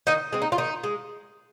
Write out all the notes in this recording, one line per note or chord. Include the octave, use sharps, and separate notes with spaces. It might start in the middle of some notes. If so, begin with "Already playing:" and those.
D#3 D#4 D#5
G#3 C4
D#4
F4
D#3 D#4
G#3